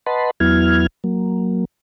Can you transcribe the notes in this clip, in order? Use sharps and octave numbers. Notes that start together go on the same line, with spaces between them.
B4 D#5 F#5 A5 B5 C6
E2 F#3 B3 E4 F6 G#6
F#3 A#3